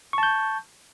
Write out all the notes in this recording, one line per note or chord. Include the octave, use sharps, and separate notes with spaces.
A5 C#6 G6